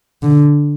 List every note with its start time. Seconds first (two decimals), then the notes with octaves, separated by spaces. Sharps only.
0.23 D3